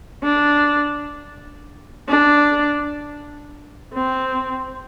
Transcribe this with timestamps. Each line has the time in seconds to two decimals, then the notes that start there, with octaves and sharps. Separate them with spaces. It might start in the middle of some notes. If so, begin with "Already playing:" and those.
0.23 D4
2.09 D4
3.94 C4